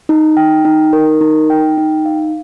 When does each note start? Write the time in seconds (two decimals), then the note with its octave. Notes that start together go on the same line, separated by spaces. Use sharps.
0.09 D#4
0.37 G5
0.65 D#4
0.93 A#4
1.21 D#4
1.50 G5
1.78 D#4
2.05 F5